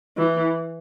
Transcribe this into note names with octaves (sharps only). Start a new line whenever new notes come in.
E3